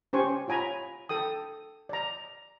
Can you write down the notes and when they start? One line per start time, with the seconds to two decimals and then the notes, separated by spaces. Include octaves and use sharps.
0.13 C#4 G4 C5 G#5 C#6
0.48 F4 C#5 G#5 A#5 B5
1.09 A4 G5 D#6
1.89 D5 A#5